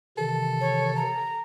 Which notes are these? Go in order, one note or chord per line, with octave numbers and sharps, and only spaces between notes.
C3 D#3 E3 A4
C#5
A#5